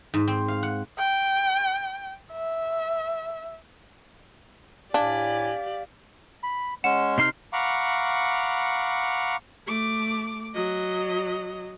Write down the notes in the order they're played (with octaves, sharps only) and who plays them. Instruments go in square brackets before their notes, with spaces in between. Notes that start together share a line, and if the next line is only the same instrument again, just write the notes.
[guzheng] G#2
C4
F5
F#5
[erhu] G5
E5
[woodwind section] A2 E4 G#5 [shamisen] D4 [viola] G4 D5 [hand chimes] F5
[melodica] B5
[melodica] G#3 C#4 [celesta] F#5 C#7 E7
[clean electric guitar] C3 D#4 C6 [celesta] F6 C7
[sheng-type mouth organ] F5 F#5 A#5 B5 C#6 D6
[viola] A3 D6
F#3 D#5